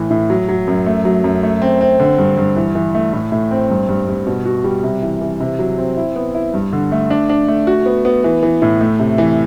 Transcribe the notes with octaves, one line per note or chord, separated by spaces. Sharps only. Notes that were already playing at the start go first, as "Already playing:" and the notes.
Already playing: A2 E3
A2
F#3
F#3
F#2
A3
F#3
F#2
A3
C4
C4
D3
G2
G2
E3
E3
A3
A2
A2
C4
G2
G2
G2
B2
F#4
G3
C3
E3
E3
C3
F#3
C4
E4
B3
E4
G2
D3
A3
D4
D4
A3
F#4
B3
B3
E3
E3
A2
A3
C3
E3